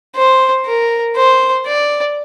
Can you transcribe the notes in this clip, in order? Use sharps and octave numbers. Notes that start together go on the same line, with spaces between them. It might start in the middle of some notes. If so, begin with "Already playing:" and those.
C5
A#4
C5
D5